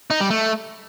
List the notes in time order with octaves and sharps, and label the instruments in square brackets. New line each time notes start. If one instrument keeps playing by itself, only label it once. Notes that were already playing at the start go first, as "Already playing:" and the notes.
[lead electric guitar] D#4
G3
A3